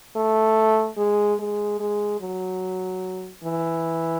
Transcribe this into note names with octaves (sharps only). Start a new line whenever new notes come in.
A3
G#3
G#3
G#3
F#3
E3